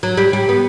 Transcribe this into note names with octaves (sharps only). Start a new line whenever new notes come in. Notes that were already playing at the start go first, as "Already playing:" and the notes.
F#3
G3
G3
B3